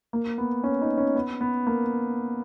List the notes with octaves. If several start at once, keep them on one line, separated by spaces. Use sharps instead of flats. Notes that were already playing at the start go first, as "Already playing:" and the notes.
A#3
B3
C#4
D#4
C#4
B3
B3
A#3